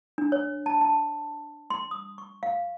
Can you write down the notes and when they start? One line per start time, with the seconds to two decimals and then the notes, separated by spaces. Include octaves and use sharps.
0.18 D4
0.32 C#5
0.66 A5
0.81 A5
1.70 C6
1.91 D#6
2.18 C#6
2.43 F5